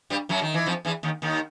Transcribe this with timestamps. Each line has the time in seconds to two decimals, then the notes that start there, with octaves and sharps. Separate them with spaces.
0.10 G2 G3
0.29 F#2 F#3
0.42 D#3
0.54 E3
0.66 F2 F3
0.85 E2 E3
1.03 D#2 D#3
1.22 D#2 D#3